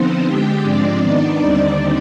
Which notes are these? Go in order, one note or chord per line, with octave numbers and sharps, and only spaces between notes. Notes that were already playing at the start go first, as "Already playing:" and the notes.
Already playing: D3 F3 B3 C4 D#4 C5
D3 G#3 D4 G4 G5
G#2 F3 G#3 C4 D4 D5
D#3 B3 D#4
D#2 D3 G3 C4 D#4